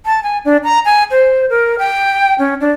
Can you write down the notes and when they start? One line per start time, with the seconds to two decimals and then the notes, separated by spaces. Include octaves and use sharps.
0.06 A5
0.23 G#5
0.45 D4
0.64 A#5
0.85 G#5
1.11 C5
1.50 A#4
1.79 G5
2.39 C#4
2.61 D4